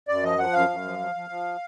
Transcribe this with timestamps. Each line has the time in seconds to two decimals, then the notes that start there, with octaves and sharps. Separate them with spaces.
0.08 F#2 D5
0.23 F3 D#5
0.38 F3 F#5
0.53 F#2 F5
0.70 F#2
0.85 F3
0.99 F3
1.15 F3
1.30 F3